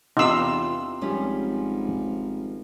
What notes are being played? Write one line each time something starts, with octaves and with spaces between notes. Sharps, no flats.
E2 C3 B3 D4 D#4 F4 F5 E6
G#1 F3 G3 C#4